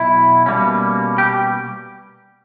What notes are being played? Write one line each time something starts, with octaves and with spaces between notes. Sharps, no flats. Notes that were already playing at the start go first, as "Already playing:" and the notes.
Already playing: B2 F#3 E4
B2 G3 A#3 C#4
G4